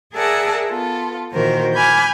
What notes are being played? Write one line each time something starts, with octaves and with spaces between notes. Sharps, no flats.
G#4 A#4 D5 E5 F#5 A5
B3 F4 A4
A#2 D#3 E3 F#4 A#4 C5
G#5 B5 D6 F6 G6